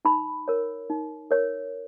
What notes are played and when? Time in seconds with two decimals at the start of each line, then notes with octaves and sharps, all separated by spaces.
0.05 D#4 B5
0.48 A#4 C#5
0.90 D#4
1.31 A#4 C#5